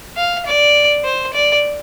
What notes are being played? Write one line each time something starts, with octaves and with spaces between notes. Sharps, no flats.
F5
D5
C5
D5